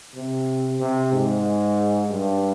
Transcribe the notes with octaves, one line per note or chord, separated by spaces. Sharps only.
C3
C3
G#2
G2